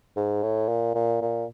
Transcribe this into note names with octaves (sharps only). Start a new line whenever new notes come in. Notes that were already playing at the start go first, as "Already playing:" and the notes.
G#2
A2
A#2
A#2
A#2